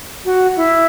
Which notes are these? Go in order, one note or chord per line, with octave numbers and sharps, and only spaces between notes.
F#4
E4